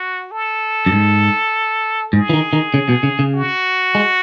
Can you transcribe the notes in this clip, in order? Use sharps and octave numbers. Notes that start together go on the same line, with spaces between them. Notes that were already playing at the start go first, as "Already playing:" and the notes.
Already playing: F#4
A4
F#2
G#2
G#2 G#4
E3
D#3
D#3
C#3
B2
C#3
C#3
F#4
G#3